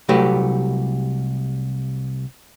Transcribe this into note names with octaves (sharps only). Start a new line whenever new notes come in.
C2 F#3 A3 G4 B4